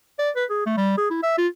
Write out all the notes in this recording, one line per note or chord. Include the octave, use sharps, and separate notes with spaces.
D5
B4
G#4
A3
G3
G#4
E4
E5
F4